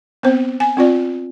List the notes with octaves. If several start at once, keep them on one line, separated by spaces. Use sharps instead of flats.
B3 C4 C5
G#5
C4 F4 D5